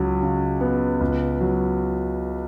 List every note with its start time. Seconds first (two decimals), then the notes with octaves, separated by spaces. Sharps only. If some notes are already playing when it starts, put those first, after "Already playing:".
Already playing: C#2 F#3
0.22 C#3
0.61 B3
1.01 C#2
1.41 F#3